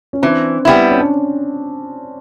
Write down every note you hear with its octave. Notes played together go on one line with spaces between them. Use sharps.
C#4
E3 C4 D4
G3 B3 E4
C#4
D4